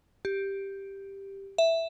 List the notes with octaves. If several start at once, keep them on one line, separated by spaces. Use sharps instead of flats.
G4
E5